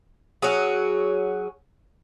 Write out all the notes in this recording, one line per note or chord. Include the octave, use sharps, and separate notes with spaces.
F#3 C#4 F#4 G#4